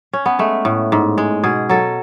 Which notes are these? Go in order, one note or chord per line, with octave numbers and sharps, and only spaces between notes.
C#4
B3
G#3 A3
A2
G#2
G#3
B2 G#4
F#3 A4